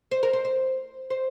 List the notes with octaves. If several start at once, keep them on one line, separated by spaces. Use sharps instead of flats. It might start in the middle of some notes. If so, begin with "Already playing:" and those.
C5
A#4
C5
C5
C5